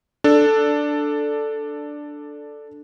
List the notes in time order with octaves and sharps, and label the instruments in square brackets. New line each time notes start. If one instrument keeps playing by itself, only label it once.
[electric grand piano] D4 A4